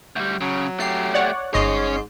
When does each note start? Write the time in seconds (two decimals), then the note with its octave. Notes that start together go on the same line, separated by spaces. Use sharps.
0.16 D2 G3
0.41 C#3 F#3
0.80 A3 G4 C7
1.14 C#5 D5 F#5
1.54 G1 G#2 C#4 C#5 D#5 C7